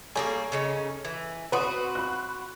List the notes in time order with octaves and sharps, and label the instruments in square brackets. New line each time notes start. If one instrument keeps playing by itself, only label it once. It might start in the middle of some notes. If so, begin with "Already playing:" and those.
[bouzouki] G3 A#3 G#4 [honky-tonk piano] A4 C#5 G#5
[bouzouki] C#3 C#4 D#4
E3
[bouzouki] C4 F#4 [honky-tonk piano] B4 C6 D#6
[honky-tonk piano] B5 F#6